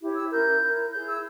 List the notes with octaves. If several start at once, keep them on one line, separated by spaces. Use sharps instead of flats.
E4 G4 C#5
E6
C#4 E4 A#4 G6
E4 A#4 C#5
E4 G#4 C#5 G6
E6